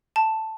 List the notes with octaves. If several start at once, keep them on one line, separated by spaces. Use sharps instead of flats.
A5